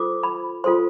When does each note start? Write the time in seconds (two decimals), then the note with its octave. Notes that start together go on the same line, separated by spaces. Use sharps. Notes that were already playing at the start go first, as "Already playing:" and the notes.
Already playing: F4 A4 C5 D6
0.23 B5
0.64 F4 A4 C5 C6